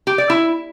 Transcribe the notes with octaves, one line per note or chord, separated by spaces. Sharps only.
G4
D5
E4